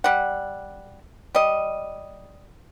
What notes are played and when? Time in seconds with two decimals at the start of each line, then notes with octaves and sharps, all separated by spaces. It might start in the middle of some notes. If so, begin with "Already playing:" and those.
0.04 G3 F#5
1.35 G3 D#5